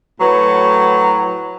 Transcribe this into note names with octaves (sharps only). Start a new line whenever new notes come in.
A2 F#3 F#4 B4